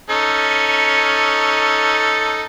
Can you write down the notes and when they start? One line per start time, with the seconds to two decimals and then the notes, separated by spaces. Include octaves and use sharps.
0.10 C#4 D#4 A4